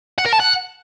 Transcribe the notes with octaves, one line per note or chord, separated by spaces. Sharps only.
F#5
A#4
A5
F#5